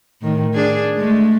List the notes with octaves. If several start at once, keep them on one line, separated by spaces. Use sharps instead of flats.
A2 D#3
D4 G#4
G#3 A3